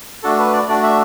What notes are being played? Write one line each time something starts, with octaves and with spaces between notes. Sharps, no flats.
A3 D4 F#4 A4
B4
D5
A3 D4 F#4 D5
E5